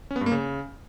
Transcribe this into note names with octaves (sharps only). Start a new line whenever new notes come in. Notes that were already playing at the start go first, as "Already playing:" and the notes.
C#4
B3
G2
A#3
C#3